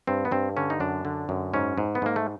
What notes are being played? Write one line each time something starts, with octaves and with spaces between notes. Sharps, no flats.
G2 C4
B3
G2 C4
D3 C#4
D#4
F#2 D4
D3
F#2
G#2 C#4
G#2
B3
G#2 A#3
A3